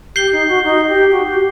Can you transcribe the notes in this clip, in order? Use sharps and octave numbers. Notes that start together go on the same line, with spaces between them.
G4 G6 C7 G7
D#4
F#4
D#4
G4
F#4
G4